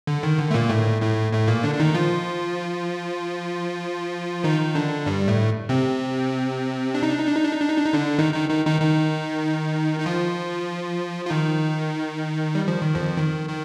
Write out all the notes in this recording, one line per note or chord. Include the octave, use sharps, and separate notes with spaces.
D3
D#3
D3
A3
A#2 A#3
A2 A3
A2 A3
A2 A3
A#2 A#3
D3 D4
D4
D#3 D#4
F3 F4
D#3 D#4
D3 D4
G2 G3
A2 A3
C3 C4
D4
D#4
D4
D#4
D4
D#4
D4
D#4
D4
D#4
D4
D#4
D3 D4
D#3 D#4
D#3 D#4
D#3 D#4
D#3 D#4
D#3 D#4
D#4
F3 F4
F4
D#3 D#4
G3
F3
D#3
F2 F3
D#3
D#3